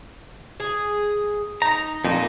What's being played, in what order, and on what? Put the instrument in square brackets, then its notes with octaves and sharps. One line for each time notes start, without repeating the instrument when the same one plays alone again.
[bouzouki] G#4
[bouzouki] D#4 [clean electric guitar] A#5
[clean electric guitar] F2 A#2 [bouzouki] D#4